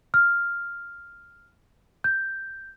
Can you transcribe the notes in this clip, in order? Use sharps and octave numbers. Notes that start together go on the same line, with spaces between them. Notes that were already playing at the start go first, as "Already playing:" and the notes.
F6
G6